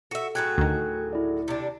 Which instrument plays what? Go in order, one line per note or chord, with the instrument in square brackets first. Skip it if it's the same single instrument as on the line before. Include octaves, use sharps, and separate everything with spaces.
[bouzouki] F#4 E5 [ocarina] A4
[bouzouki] A2 F#3 G#4 [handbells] G5 F#6 G#6
[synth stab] D2 D#3
[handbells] E4 D5
[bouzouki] C3 D4 [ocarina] G4